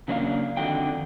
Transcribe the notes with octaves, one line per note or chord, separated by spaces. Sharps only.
C#3 F#3 A#3 D4 C5 F5
F2 D3 D#3 D4 F#4 G5